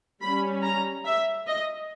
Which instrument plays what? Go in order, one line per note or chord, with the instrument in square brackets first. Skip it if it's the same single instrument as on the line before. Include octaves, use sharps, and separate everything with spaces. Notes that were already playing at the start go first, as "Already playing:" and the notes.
[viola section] G3 C#4 B5
A#5
E5
D#5